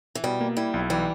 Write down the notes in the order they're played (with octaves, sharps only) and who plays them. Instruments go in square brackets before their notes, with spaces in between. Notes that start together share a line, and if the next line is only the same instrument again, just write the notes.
[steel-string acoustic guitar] E3
[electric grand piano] B2 [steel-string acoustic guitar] G3
[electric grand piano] A#3
[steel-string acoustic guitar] G3 [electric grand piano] E4
[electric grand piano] B1
[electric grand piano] E3 [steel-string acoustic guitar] G3